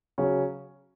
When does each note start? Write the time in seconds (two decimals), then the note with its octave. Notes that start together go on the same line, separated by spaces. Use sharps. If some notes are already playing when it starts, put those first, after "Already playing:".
0.18 C#3 F#3 C#4